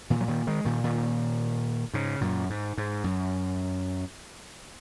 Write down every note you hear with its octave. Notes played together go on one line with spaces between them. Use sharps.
A#2 D#3
F#3
A#2 D#3
D#3 G#3
A#2 D#3
A#2 D#3
G#2 C#3
F#2 A#2
G#2
G#2
F#2